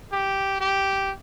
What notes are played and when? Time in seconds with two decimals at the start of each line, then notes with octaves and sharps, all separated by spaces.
0.12 G4
0.60 G4